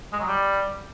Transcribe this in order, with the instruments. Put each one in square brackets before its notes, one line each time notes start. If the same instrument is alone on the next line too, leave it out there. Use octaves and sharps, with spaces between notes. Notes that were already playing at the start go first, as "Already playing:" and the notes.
[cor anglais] G#3
F#3
G3